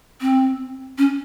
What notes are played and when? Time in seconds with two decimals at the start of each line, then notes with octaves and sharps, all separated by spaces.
0.21 C4
0.98 C#4